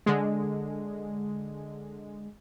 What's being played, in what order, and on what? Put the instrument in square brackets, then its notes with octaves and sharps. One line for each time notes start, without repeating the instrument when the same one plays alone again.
[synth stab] D3 G#3